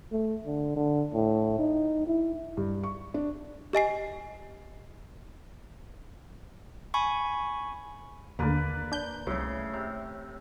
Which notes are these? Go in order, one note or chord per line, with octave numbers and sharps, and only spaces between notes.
A3
D3
D3
A2
D#4
E4
G2
C#6
D4
G4 D#5 G#5 C7
G#5 B5 C#6
D#2 D3 A#3 B4 D5
D4 G6
C2 A2 C#3
C3